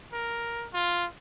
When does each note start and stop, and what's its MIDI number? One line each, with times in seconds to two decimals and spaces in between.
0.13 0.67 70
0.74 1.07 65